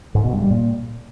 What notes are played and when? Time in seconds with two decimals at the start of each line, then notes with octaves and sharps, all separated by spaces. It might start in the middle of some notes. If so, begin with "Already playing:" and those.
0.15 G#2
0.24 B2
0.33 G2
0.42 G3
0.51 A#2